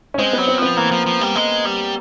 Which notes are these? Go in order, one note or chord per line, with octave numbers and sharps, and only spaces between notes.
C#4
G#3 C4
F#3 B3
C4
F3 B3
E3 A#3
F3
F3
G3
G#3
G3